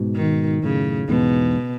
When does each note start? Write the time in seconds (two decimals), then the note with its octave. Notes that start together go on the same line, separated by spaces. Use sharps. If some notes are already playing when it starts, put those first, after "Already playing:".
Already playing: G#2 B2
0.16 D#3
0.63 F#2 A2 C#3
1.08 E2 G#2 B2